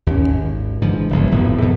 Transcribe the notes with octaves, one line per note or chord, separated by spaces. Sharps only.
D#2 C#4
G#1
G#2 D3 E3 F3
F#1 B1
D#1 F2 A2 B3
G#2 B2